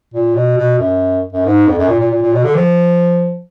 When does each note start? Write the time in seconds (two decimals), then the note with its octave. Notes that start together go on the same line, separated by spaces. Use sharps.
0.14 A#2
0.35 B2
0.57 B2
0.79 F#2
1.33 F#2
1.45 G#2
1.67 F2
1.78 F#2
1.88 A#2
2.00 A#2
2.10 A#2
2.22 A#2
2.33 B2
2.44 D3
2.55 F3